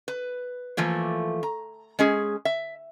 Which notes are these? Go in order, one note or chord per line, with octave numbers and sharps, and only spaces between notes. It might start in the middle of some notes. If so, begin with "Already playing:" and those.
B4
E3 F3 A3 A#3
A#5
G#3 C#4 G#4
E5